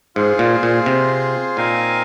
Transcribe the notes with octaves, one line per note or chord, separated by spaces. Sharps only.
G#2 F4 G#4 C5
A#2
A#2
C3
A#2 C4 D#4 A#4 F5 G#5